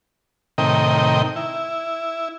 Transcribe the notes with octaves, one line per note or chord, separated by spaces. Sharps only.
A2 C3 D#3 A#4 D#5 G5
E4